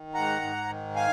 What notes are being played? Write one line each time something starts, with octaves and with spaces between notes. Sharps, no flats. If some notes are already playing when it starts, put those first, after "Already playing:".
Already playing: D#3
G#2 F#5 A#5
G#2
D#3
F5 G#5